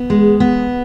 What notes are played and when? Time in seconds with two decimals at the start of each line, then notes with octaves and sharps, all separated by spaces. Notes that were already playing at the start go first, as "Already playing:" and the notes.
Already playing: B3
0.10 G#3
0.40 B3